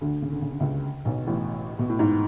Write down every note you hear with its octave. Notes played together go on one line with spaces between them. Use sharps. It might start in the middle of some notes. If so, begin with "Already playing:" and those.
D2 D3
C#3
D3
C#3
D3
C#2 C#3
B1 B2
A1 A2
B2
A2
G#2